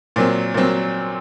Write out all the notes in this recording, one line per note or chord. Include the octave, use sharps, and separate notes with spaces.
A#2 F#3 C4
A#2 F#3 C4